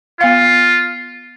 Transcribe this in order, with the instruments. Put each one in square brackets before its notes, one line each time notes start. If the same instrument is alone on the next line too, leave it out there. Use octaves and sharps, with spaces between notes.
[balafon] B3 F5 [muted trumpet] F4